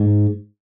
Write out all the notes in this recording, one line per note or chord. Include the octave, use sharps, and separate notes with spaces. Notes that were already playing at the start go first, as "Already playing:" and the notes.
Already playing: G#2